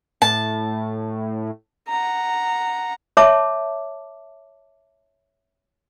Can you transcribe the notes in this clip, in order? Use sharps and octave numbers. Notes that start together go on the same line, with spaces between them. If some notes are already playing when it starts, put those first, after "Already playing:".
A2 A5
F#5 A#5
C#5 E5 A5 D6